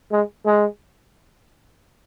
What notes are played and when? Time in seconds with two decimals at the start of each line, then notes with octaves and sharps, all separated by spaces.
0.12 G#3
0.46 G#3